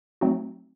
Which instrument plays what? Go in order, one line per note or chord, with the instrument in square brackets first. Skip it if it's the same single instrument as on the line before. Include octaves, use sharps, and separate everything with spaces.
[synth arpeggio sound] F#3 A3 C4 D#4 F#4